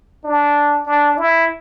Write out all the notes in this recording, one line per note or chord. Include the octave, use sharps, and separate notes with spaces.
D4
D4
E4